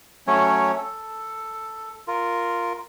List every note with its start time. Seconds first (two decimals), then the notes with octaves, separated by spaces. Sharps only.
0.27 F#3 A3 C#4 C#5
0.77 A4
2.07 F4 A#4